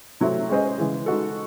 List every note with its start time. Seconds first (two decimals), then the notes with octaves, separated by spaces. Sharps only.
0.20 C3 F#3 A3 C4 E4
0.50 G#3 C#4 G#4 C5 D#5
0.78 C#3 E3 G#3
1.06 G#3 D#4 F#4 A4